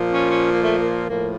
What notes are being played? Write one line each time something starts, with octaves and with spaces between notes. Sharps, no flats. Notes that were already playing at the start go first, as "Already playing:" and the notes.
Already playing: A#2 F3
C#4
C#4
A#3
A3
A#3
A2 F3 A#3